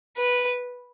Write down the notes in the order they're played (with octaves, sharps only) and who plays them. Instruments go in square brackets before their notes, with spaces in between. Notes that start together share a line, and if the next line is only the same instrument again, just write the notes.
[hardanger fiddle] B4